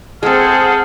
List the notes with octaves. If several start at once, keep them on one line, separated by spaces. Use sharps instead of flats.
G#3 C4 G#4 A4 C5 F#5 F6